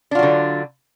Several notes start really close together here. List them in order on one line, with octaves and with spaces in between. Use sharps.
D4 F4 F#3 D3